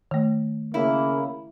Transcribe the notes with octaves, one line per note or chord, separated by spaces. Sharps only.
D#3 A3
C#3 A#3 E4